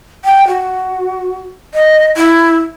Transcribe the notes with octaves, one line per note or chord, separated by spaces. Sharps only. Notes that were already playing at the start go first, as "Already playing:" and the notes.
G5
F#4
D#5
E4